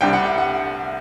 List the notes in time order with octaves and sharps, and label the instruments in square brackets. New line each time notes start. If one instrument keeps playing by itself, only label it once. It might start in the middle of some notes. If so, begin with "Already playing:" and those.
[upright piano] C2 C3 G3 D4 G5
F#5
E5
F#5